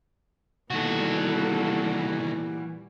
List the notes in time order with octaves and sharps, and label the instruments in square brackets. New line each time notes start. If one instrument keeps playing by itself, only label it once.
[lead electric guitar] C2 D#3 [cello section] A#2 G3 [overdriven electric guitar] E3 F#4 [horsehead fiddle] B3 A4